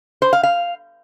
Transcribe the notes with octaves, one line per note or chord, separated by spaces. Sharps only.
C5
F5
F5